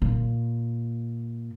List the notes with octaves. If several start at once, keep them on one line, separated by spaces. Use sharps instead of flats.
A#2